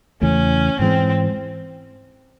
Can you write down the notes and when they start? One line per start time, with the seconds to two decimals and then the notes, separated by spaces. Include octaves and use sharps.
0.21 E2 C#3 E3 A3 C#4
0.79 G#2 E3 G#3 C4